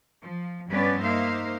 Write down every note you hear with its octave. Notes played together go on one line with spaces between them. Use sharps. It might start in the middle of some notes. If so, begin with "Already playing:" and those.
F3
G2 F3 B3 C#4 B4 D5
A#3 D#4 C5 E5 F5